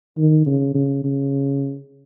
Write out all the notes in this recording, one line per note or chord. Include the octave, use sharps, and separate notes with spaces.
D#3
C#3
C#3
C#3